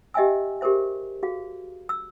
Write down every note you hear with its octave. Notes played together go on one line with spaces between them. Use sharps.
G4 D#5 E5 G5 G#5 E6
G4 G#4 A#4 C5 E5
F#4 G#4 F5
E6